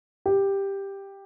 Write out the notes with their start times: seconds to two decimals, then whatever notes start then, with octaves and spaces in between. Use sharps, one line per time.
0.26 G4